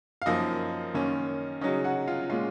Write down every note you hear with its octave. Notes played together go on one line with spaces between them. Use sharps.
F5
F#2 F3 A#3 D#4 D#5
F#2 D#3 A#3 C#4
C#3 F#3 C#4 D#4 D#5
F#4 F#5
F4 F5
A#2 G#3 C#4 F4 F5